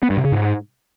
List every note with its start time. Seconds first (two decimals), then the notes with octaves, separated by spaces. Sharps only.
0.03 B3
0.10 G2
0.17 C3
0.25 C#3
0.32 G#2